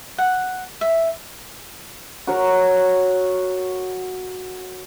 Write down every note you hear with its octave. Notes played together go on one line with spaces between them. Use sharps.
F#5
E5
F#4 A#4 C#5